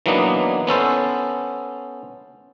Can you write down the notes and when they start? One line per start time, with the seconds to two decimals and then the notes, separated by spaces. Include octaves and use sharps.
0.06 E3 F#3 A#3 B3 D4 D#4
0.67 B3 C#4 A4 C5